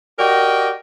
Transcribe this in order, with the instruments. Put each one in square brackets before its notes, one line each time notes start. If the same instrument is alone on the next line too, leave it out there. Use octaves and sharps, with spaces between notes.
[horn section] F#4 G4 A#4 D5 D#5 G5